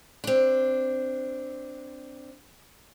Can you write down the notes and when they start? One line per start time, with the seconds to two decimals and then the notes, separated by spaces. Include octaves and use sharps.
0.24 C4 D4